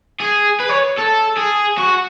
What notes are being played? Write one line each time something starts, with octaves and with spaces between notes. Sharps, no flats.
G#4
B4
C#5
A4
G#4
F#4